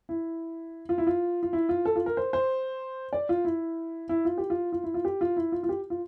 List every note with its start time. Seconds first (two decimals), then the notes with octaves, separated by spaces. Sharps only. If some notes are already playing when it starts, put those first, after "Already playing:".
0.09 E4
0.89 F4
0.98 E4
1.07 F4
1.43 F4
1.53 E4
1.69 F4
1.85 A4
1.96 F4
2.06 A#4
2.17 C5
2.33 C5
3.13 D5
3.29 F4
3.45 E4
4.09 E4
4.25 F4
4.38 G4
4.50 F4
4.72 F4
4.84 E4
4.94 F4
5.05 G4
5.21 F4
5.37 E4
5.52 F4
5.63 F4
5.69 G4
5.90 F4